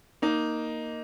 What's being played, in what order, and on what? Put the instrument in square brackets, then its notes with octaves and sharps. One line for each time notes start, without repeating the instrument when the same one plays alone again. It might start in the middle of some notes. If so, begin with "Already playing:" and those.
[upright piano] A#3 D#4